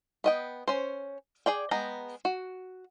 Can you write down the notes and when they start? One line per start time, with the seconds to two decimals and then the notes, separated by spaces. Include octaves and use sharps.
0.24 B3 D#5 G5
0.68 C#4 C5
1.46 G#4 D5 G5
1.71 G#3 B3 G5 A#5
2.25 F#4